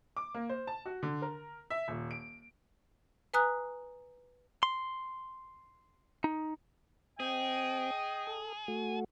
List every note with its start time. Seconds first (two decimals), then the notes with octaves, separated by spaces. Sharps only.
0.17 D6
0.35 A#3
0.49 C5
0.67 A5
0.86 F#4
1.03 D3
1.22 A#4
1.70 E5
1.88 D#1
2.11 D7
3.34 B4 G#5 A#5 D#6 F#6
4.63 C6
6.24 D#4
7.20 C4 G#4 D#5 G5
8.27 A4
8.68 A3 F#4